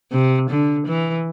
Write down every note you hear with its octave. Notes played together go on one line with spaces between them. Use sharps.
C3
D3
E3